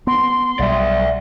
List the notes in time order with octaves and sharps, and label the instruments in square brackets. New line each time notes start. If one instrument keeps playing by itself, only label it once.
[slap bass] B3 [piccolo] C6
[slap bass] B1 F#3 G3 [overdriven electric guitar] D5 E5